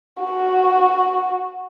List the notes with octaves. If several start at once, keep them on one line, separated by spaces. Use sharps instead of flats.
F#4